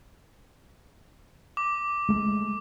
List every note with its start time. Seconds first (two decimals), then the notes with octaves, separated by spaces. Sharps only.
1.57 D6
2.09 G#3 A3